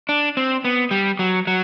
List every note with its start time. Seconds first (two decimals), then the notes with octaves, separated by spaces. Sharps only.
0.09 D4
0.37 C4
0.65 B3
0.91 G3
1.19 F#3
1.47 F#3